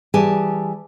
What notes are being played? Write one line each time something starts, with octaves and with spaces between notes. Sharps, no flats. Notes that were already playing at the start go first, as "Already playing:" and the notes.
E3 G3 G4 G#4 G#5 A5